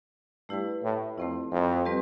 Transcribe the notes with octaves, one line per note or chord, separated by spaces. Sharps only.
G2 A3 E4 G4 B4
A2
F2 A3 C4 E4
F2
G3 C4 G4 B4